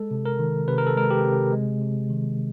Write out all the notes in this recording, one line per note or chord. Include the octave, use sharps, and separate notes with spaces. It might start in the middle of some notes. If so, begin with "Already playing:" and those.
Already playing: G#3 A4
C3
A#4
D#3
C3 B4
A#4
A4
G#3 A#4
G4
C3
G#3
C3
D#3